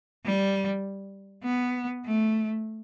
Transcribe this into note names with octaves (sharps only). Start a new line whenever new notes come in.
G3
B3
A3